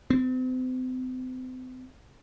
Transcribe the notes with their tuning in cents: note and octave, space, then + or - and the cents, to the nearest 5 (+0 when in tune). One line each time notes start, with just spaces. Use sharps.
C4 -40